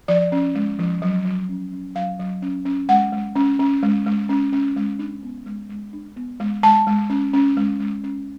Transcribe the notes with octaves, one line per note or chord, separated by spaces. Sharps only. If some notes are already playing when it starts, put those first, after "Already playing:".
F3 D5
C#4
G#3
F3
F#3
F#3
C#4
C#4
F#3 F5
F#3
C#4
C#4
G#3 F#5
G#3
C#4
C#4
G#3
G#3
C#4
C#4
G#3
D4
B3
G#3
G#3
D4
B3
G#3
G#3 A5
G#3
C#4
C#4
G#3
G#3
C#4